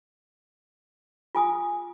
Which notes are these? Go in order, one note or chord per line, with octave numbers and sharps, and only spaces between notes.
F4 G#5 D#6